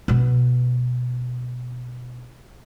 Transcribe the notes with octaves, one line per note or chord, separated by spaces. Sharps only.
B2 B3